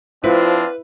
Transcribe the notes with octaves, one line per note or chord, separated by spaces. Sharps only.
F3 C4 D4 E4 B4 F5